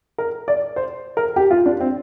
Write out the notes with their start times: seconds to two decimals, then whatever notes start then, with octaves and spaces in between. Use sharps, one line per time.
0.18 A#4
0.48 D5
0.76 C5
1.17 A#4
1.36 G4
1.51 F4
1.66 D4
1.81 C4